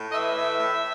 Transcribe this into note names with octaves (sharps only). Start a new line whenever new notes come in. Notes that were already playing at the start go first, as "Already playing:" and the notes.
Already playing: A2
D#5
E3 E5
A2
A2